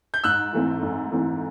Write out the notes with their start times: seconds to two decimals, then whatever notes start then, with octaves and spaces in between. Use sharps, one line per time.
0.14 G6
0.24 G#2 E6 F#6
0.53 E3 A3 C4
0.83 G#2
1.12 E3 A3 C4